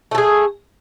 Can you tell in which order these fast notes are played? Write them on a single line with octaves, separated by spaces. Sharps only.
A3 A4 G#4